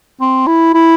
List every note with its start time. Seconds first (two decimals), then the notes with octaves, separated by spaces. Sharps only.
0.21 C4
0.47 E4
0.74 E4